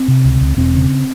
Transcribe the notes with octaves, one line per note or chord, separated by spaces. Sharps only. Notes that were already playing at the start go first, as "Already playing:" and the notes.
Already playing: C4
C3
C#2
C#2
E1 C4
C#3